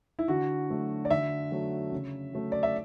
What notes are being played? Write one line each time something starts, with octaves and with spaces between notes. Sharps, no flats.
E4
D3 F#4
F#3 A3
D5
D3 E5
F#3 A3
C#3
F#3 A3
D5
E5